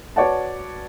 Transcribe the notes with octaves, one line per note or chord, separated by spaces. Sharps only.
F#4 B4 C#5 D5 F#5 A5